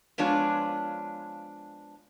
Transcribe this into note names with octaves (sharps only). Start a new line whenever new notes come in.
F3 G#3 B3 D4 F4 C#5